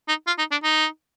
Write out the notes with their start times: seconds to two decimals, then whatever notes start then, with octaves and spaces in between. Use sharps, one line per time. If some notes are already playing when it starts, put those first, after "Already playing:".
0.08 D#4
0.27 F4
0.38 D#4
0.51 D4
0.63 D#4